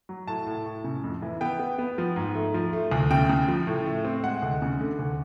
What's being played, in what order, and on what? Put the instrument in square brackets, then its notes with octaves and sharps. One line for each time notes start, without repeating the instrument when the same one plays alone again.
[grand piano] F#3
A2 A5
A2
A2
C#3
F2
E3
B3 G5
B3
B3
F3
G#2
A3
F3
A3
D2
C#3 G5
C#3
F3
A2
A3
C4
G#3 F#5
D2
C#3
D3
D2